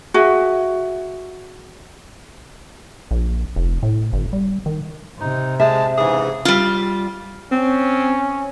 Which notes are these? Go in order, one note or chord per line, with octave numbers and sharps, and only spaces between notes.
F#4 G#4 E5 G#5
A#1
F1
A2
G1
G3
D#3
C3 D#4
G#3 E5 A5
G#2 C#3 E3 G#4
G3 F4
C4 C#4